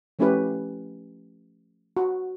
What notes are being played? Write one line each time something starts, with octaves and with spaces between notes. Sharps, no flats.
F3 A3 C#4 E4 G4 B4
F#4